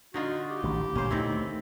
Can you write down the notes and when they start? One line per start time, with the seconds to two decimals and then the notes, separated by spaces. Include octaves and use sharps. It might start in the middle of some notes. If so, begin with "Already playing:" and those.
0.14 D3 D#4 F4 F#4
0.50 G4
0.64 A1 D#3
0.95 A#2 C#4 C5
1.11 D2 D#3 A3 C4 E4